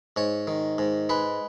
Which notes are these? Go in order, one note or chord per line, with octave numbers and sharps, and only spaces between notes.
G#2 C#5
D#3
G#2
G#3 B4